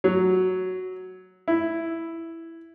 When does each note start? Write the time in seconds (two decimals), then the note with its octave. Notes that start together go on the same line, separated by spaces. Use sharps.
0.04 F#3
1.48 E4